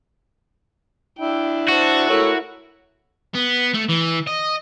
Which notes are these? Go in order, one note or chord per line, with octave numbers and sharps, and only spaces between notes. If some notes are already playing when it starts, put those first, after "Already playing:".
D4 E4 G5
F#4 C5 A5
A3 E4 A#4 C#5 E6
B3
A3
E3
D#5